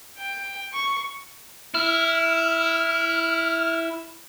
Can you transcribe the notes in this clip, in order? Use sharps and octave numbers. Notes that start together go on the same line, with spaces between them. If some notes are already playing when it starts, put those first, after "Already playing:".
G5
C#6
E4 F6